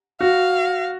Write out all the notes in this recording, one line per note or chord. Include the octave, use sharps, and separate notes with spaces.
F#4 F5